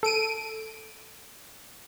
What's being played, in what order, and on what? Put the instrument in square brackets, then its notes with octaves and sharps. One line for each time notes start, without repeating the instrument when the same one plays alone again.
[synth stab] A4 D7 D#7